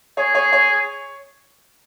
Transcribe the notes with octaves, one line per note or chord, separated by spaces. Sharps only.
G#4 C#5
C#5
C#5